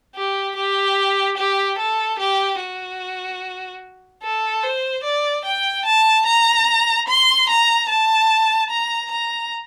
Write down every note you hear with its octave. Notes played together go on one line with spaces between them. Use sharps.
G4
G4
G4
A4
G4
F#4
A4
C5
D5
G5
A5
A#5
C6
A#5
A5
A#5
A#5